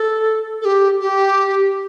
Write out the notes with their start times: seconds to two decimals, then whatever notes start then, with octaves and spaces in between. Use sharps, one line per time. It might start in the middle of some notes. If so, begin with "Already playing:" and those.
Already playing: A4
0.62 A4
0.65 G4
1.01 G4